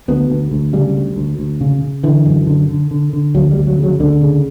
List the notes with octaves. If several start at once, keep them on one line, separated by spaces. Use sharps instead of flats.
D2 B3
D2
D2
C#3 G3
D2
D2
D2
C#3
C#3
D3 E3
F#2
D3
D3
D3
D3
D2 F#3
G3
D2
F#3
C#3
F#3
D2 D3
C#3